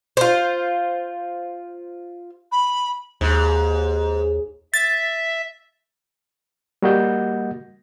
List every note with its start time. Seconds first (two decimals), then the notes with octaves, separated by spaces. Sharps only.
0.17 F4 C5
2.52 B5
3.21 D#2 G#2
4.74 E5 A6
6.82 G3 A#3 F#4 D#5 F#5 G6